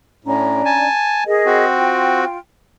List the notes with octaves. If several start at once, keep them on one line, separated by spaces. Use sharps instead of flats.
A2 C#4 D4 A#5
G#5 A5
G#4 A#4 D#5
C4 F#4
F4 G5